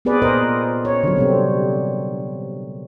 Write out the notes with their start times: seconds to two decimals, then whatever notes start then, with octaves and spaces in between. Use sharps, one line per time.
0.05 B3 C4 G#4 B4 D5
0.22 A#2 A#4 C5 D#5
0.85 C#5
1.03 D3 F#3
1.16 C3 G3 C4